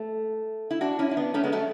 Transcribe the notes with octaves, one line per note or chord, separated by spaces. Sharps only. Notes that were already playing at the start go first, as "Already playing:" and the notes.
Already playing: A3
E4
D4 F#4
C#4 E4
E4
B3 D4
A3 C#4
G#3 B3
F#3 A3